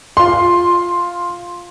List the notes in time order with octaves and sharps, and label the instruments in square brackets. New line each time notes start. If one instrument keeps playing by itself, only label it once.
[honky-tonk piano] F4 C6